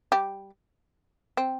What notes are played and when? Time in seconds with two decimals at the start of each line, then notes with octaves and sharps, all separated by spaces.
0.12 G3 G4
1.37 C4